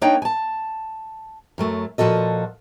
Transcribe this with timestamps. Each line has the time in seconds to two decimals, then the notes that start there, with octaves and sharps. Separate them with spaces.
0.02 A#3 D4 D#4 C#5 G5
0.22 G#5 A5
1.58 F#2 F#3 A3
1.98 A#2 F3 F#4 A4 D#5